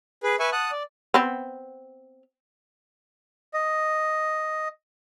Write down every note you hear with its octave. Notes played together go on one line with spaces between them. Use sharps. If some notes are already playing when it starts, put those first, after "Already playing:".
G#4 B4
B4 E5 G#5 C#6
F#5 A5 D#6 F#6
D5
B3 C4
D#5